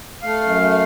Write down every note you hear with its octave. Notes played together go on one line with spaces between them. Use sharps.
A3 F5
F#2
A3